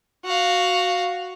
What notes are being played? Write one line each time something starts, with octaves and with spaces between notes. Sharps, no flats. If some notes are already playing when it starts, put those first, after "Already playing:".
F#4 F5